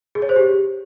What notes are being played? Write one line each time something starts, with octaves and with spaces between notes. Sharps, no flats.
G#4
C#5
C5
G4